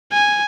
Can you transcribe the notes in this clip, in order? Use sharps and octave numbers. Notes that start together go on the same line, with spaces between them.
G#5